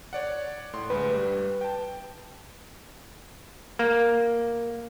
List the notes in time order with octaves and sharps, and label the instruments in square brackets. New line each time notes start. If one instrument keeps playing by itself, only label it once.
[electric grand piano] C#5 D5 F#5
A2 C6
[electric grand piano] D2 G#3 [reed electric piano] B4
[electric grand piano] G2 G3
G5 A5
[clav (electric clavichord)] A#3